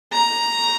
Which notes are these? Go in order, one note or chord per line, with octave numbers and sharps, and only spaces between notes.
A#5